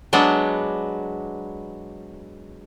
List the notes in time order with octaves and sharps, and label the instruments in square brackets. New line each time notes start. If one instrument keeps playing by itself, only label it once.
[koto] F#3 G#3 B3 D4